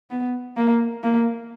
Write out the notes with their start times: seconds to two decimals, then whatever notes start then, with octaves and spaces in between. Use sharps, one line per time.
0.10 B3
0.57 A#3
1.03 A#3